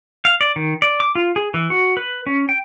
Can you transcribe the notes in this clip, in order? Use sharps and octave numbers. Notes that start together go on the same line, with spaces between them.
F5
D5
D#3
D5
D6
F4
G#4
E3
F#4
B4
C#4
G5